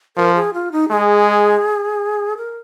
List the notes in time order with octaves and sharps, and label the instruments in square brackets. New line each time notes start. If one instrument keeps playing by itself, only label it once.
[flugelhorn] F3 [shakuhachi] A#4
[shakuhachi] G#4
F4
D#4
[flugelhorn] G#3 [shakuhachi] G#4
[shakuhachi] A#4